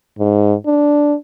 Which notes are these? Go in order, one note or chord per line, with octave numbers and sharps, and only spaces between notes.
G#2
D4